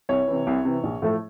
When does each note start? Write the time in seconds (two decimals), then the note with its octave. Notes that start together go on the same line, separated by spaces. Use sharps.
0.09 C2 C#5
0.28 C3 E3
0.47 C2
0.65 C3 E3
0.83 A#1
1.02 A2 F3 A3